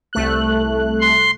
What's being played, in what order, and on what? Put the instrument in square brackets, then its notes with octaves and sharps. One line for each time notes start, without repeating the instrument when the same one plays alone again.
[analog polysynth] C2 A3 F#6
[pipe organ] C6